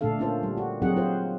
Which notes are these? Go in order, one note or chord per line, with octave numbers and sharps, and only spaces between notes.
A#2 D3 A3 D4 A4 F5
A#3 C#4 F4 A4 C5
G3
F#4
F#3 C4 D#4 F#4 G#4 F#5
F4 C5